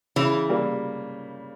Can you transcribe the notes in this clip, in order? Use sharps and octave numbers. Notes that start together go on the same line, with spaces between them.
C#3 E3
G3 A#3